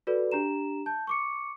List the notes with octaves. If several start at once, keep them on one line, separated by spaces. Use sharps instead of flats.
F#4 A4 B4 D5
D4 G4 A#5 E7
A5 G6
C#6 D6 C#7